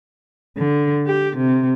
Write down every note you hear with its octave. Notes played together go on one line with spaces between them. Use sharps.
D3
G4
C3